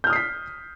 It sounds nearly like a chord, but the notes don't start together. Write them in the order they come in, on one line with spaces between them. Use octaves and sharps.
G6 F6 D#6 C7 B6